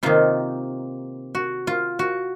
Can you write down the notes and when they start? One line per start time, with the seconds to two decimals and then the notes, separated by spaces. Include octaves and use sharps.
0.03 C3 D#3 A#3 D#4 F4
1.35 F#4
1.67 F4
1.99 F#4